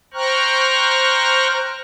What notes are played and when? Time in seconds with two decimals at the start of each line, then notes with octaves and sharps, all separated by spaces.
0.14 C5 G5 A#5 C#6 F6 F#6